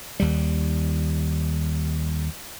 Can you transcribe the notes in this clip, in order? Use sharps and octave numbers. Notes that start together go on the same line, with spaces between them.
D#2 G3